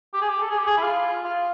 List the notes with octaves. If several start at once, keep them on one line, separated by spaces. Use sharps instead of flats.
G4
G#4
G4
A4
G#4
G4
G#4
E4
F4
F4